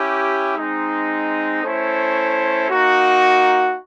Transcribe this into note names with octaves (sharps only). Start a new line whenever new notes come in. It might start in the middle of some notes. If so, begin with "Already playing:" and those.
Already playing: C#4 E4 G4
G#3 C4 D#4
A3 C#4 E4 A4 C5
A#3 D#4 F#4